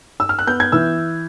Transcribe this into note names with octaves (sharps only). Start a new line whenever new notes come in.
E6
F6
F#6
B3 G6
G#6
E3 E6